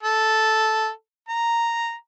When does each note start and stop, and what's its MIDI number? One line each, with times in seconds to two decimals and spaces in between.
0.03 0.89 69
1.28 1.93 82